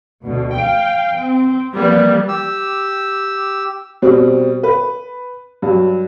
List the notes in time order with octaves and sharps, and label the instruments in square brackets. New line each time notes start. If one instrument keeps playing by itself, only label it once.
[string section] D2 B2
F5 G5
C4
E3 F3 G3 A#3 B3
[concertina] G4 E6
[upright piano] B2 G3 C4
B4
G2 F#3